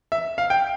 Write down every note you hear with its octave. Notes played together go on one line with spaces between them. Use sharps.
E5
F5
G5